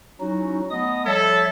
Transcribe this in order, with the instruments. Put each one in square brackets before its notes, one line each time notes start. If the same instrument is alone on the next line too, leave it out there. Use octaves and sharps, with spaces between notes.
[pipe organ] F#3 D#4 [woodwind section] C#4 E4 F#4
[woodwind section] A3 B3 D#5 [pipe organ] D#6
[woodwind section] F3 G3 [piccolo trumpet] A4 [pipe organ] C#5 E5